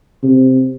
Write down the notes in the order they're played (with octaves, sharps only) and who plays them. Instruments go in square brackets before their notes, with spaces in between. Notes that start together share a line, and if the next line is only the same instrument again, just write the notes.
[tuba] C3